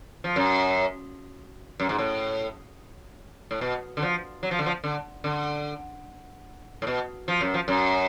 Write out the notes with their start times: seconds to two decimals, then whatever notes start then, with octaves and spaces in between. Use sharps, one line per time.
0.24 F3
0.36 F#2
1.80 F#2
1.89 G#2
1.98 A2
3.51 A2
3.61 B2
3.97 D3
4.02 F3
4.43 F#3
4.51 F3
4.59 D3
4.66 F3
4.84 D3
5.24 D3
6.82 A2
6.87 B2
7.28 F3
7.41 F#2
7.54 F3
7.68 F#2